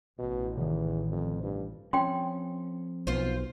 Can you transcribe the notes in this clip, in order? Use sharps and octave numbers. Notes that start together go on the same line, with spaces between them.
A1 B2
E2 C3 D#3
F2
G2
F3 C4 C#4 G5 C6
B1 B3 F4 C5